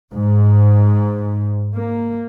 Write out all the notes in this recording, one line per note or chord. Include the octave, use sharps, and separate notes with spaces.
G#2
A#3